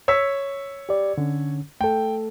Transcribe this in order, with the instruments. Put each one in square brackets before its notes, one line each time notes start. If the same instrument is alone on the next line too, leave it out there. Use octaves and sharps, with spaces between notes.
[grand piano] C#5 E6 B6
[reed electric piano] G4 D5
D3 C#4
[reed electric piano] A3 A4 [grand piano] G5